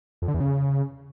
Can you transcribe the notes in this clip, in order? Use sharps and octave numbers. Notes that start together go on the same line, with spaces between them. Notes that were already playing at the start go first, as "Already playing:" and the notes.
F2
D3
E2
C#3